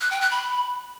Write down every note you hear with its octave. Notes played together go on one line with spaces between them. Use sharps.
F#6
G5
F#6
B5